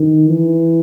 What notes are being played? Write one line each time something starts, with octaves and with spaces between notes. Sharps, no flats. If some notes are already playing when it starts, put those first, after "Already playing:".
Already playing: D#3
E3